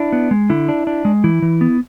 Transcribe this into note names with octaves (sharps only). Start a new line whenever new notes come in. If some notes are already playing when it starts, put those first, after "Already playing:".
Already playing: D4 E4
B3
G#3
D3 E4
D4
D4
G#3
E3 E4
E3
B3